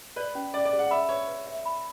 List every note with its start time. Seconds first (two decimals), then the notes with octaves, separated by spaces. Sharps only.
0.16 B4 D5
0.35 C#4
0.54 C#4 D5
0.65 D5
0.73 G#4
0.79 F#5
0.91 E5 B5
1.09 B4 C#5
1.27 B4
1.47 E5
1.65 B5